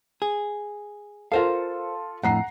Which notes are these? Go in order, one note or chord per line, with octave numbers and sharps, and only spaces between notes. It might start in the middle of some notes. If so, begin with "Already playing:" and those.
G#4
F4 A4 A#4 C5 F5
F2 A2 F#5 A#5 C7